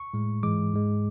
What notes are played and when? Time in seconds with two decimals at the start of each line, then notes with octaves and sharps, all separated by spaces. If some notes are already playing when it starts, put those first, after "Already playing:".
Already playing: C#6
0.14 A2 G#3
0.43 G#2 E3 G#3 D6
0.73 G#2 G#3